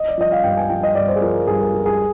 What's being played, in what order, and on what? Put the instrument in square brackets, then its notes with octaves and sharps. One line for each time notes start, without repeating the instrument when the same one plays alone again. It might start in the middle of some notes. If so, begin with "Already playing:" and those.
Already playing: [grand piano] D#5
D5
F3 D#5
F5
G2 G5
G#5
F3 G5
D#5
G2 D5
C5
G#4
F3 A#4
A#4
G2 G#4
A#4
F3 A#4
G#4